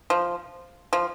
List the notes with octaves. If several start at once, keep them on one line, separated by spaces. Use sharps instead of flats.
F3
F3